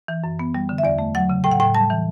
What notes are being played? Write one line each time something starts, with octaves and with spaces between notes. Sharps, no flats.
E3
F#2
B3
G3
D3
E5
E2 D5
A3
F#3 F#5
C#3
A2 G5
F#5
A2 G5
G3 A5
E3